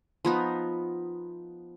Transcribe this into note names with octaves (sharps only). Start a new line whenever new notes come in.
F3 B3 D#4